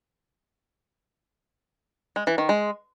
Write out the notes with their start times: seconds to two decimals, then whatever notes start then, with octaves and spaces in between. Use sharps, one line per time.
2.16 G#3
2.27 E3
2.38 D#3
2.49 G#3